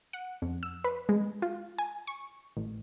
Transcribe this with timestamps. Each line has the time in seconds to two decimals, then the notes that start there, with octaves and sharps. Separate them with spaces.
0.13 F#5
0.42 F2
0.63 E6
0.84 B4
1.09 G#3
1.42 F4
1.78 G#5
2.07 C#6
2.57 A1